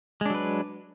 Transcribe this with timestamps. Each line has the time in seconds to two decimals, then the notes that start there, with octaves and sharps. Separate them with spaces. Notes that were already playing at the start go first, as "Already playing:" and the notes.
0.21 G#3
0.26 D4
0.30 F#3
0.35 B4